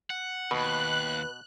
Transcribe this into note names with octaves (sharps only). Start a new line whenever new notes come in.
F#5
D#2 B2 B4 F#6